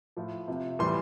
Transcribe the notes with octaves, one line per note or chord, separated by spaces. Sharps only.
A2 F3
C3 F3
A2 E3 G3 C6